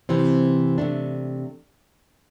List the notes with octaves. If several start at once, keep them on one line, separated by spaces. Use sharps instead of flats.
C3 E3 C4
C3 A3 D4